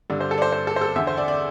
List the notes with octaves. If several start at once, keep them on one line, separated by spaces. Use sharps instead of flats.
G2 D3 D5
C5
A4
D5
C5
C5
A4
C5
A4
E2 D3 E5
C5
D5
D5